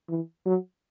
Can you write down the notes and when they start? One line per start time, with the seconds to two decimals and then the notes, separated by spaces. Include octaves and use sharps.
0.09 E3
0.46 F#3